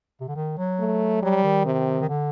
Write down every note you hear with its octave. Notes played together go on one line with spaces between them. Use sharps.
C3
D3
D#3
F#3
A3
F#3 G3
D#3
C3
D#3
D3